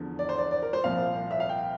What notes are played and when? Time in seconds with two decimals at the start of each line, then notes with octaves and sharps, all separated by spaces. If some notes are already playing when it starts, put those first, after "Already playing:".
Already playing: E2 D3 F3
0.19 D5
0.29 C5
0.38 D5
0.51 D5
0.62 A#4
0.73 C5
0.84 C2 A#2 F3 F5
1.31 E5
1.40 F5
1.49 G5